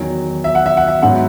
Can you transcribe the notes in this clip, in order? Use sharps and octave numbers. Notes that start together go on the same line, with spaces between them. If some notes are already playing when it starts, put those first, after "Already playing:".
Already playing: E2 D#3 F#3
E5
F#5
E5
F#5
E5
G#2 F#3 B3 D#4 F#5